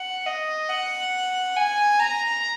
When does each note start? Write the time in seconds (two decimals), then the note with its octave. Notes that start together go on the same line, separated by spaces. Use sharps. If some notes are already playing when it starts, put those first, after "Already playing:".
Already playing: F#5
0.26 D#5
0.69 F#5
1.56 G#5
2.00 A#5